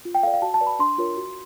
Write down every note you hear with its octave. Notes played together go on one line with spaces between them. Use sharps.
F4
G5
A4 D5 F5
F5
F#4 A5
A5
B4 D5
B5
D4 C6
F4 A#4 C#5
F#4